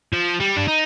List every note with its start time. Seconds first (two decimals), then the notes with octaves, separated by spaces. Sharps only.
0.13 F3
0.40 G3
0.57 D4
0.68 D#4